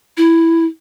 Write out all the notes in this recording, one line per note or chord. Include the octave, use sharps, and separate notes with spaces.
E4